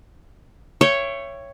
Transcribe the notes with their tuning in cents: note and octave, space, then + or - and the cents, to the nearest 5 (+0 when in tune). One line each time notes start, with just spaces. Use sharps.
C#5 +0 E5 +30 G5 -15